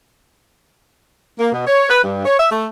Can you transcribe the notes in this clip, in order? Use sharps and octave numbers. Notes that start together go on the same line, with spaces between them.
A#3
B2
C#5
B4
G2
C#5
E5
A3